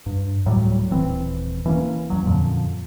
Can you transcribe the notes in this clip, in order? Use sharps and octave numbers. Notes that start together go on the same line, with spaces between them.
G2
D2 A2 F#3 G3
D#1 E3 C4
E3 A#3 C#4
E2 F#3
F2 A#2 D3 F3